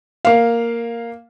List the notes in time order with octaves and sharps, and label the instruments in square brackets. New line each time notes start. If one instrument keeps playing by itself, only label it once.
[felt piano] A#3 F5